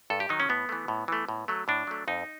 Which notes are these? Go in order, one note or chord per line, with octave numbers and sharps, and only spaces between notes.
G2 A4
G4
D#3 F#3 D#4
C#4
A2 B3
E3 A3
A2
E3 A3
A2
F#3 A3
A2 D4
F#3 A3
F2 D#4